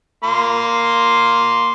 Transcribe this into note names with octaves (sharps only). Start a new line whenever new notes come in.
A#3 C6